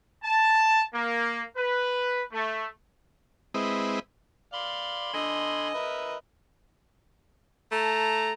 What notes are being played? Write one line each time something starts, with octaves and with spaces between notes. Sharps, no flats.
A5
A#3
B4
A3
G#3 C4 E4 B4 D#5
D5 F5 B5 C6
D3 D#5 G#5
A#4 B4 E5
A3 A5 A#5